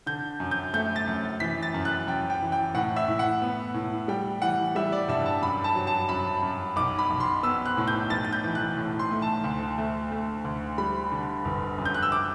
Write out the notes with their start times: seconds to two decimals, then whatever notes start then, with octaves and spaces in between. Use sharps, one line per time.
0.06 D3 G6
0.40 F#2
0.51 G6
0.73 A3 G6
0.96 A6
1.07 F#2
1.40 E3 B6
1.63 A6
1.74 F#2
1.85 F#6
2.07 F#2 G5
2.30 G5
2.41 E3
2.52 G5
2.75 A2 F#5
2.96 E5
3.08 A2
3.19 F#5
3.42 B3
3.74 A2
4.08 G3 G5
4.42 E3 F#5
4.75 G3 E5
4.92 D5
5.08 G2 E5
5.26 A5
5.42 F#2 B5
5.64 A5
5.75 F#3
5.87 A5
6.09 F#2 B5
6.43 F#2
6.76 B1 D6
6.99 B5
7.10 B1
7.20 C6
7.43 B3 E6
7.66 F#6
7.77 A2
7.88 G6
8.10 B1 A6
8.25 A6
8.33 G6
8.44 E3
8.55 F#6
8.77 A2
8.99 C6
9.11 A3
9.22 A5
9.44 D2
9.78 A3
10.12 A3
10.44 D2
10.78 G3 B5
11.12 D3
11.45 G1
11.78 F#2
11.85 G6
11.94 F#6
12.03 E6
12.12 D6